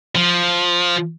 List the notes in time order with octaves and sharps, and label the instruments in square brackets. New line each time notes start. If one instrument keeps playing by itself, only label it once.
[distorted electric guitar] F3